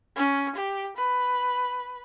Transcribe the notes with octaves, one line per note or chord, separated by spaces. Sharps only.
C#4
G4
B4